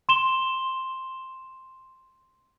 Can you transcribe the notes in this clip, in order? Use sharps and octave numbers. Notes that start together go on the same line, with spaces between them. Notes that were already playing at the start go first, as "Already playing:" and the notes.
C6 E7 G7